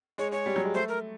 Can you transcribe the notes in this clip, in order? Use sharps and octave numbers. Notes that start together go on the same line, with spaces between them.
G#3 C#5
G#3 C#5
G3
F#3
G#3
A3 C5
A#4